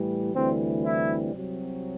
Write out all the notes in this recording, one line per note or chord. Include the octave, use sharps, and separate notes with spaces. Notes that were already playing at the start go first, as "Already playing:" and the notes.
Already playing: A2 E3 G3
D2 C3 E3 G3 C4
E4
C2 C3 F#3